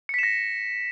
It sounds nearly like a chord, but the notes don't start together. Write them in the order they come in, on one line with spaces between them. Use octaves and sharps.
C#7 B6 E7 A#6